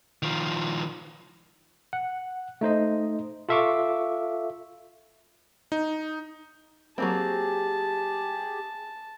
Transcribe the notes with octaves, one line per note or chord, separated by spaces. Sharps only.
D#3 F3
F#5
A3 D#4 C5 D#5
F4 A4 E5 F5 C#6 D6
D#4
F#3 A#3 C4 G4 G#4 A5